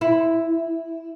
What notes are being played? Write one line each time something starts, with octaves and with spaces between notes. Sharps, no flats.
E4